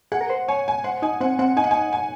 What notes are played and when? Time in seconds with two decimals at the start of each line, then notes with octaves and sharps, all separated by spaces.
0.12 G#4 F#5
0.21 A#4
0.30 C5
0.48 C#5 G#5
0.68 G#5
0.84 C5 F#5
1.02 D#4 G#5
1.21 C4 F#5
1.39 C4 F#5
1.57 D#4 G#5
1.64 F#5
1.71 G#5
1.93 G#5